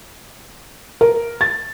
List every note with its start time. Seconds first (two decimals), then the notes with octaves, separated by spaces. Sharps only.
1.01 A#4
1.41 A6